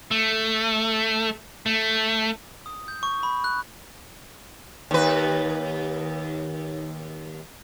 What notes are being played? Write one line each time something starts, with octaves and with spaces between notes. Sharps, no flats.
A3
A3
D#6
G6
C#6
B5
F#6
D#2 B4